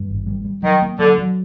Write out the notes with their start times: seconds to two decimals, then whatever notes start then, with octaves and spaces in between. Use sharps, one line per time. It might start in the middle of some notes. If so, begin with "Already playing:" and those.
Already playing: G2
0.09 G#1
0.27 G3
0.45 G3
0.63 D#3 F#3
0.82 A#3
0.99 D3 F#3
1.18 F#3